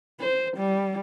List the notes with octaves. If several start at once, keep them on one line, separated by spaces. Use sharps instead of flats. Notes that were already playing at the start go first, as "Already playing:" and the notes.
C5
G3